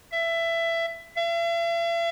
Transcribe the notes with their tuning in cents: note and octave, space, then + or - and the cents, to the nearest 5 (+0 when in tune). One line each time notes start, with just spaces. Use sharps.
E5 +20
E5 +45